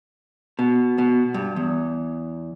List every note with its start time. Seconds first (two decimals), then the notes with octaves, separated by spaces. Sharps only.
0.59 B2
0.98 B2
1.34 G2
1.56 E2